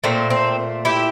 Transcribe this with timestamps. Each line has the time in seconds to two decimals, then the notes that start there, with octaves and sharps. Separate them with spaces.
0.04 A#2 A3 C4
0.30 C4
0.85 E4 G4